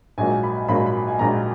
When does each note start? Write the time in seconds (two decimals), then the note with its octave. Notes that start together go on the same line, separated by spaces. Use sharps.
0.18 A#1 G#2 F#3 A#3 G#5
0.43 B5
0.68 A#1 G#2 F#3 A#3 B5
0.86 B5
1.08 G#5
1.19 A#1 G#2 F#3 A#3 A#5